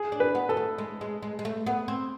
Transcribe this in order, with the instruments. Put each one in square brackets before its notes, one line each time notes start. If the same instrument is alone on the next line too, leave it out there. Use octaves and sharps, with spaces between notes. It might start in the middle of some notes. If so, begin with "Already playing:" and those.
Already playing: [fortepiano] G#4
[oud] D4
[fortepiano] B4
[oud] B3
[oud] B3 [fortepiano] A4
[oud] A3
G#3
G#3
G#3
G#3
A3
B3
C4